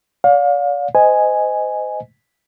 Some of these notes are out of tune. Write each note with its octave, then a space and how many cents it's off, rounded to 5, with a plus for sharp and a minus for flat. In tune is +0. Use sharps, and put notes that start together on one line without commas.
D5 -40 F5 +30
C5 -35 D#5 +0 G#5 +0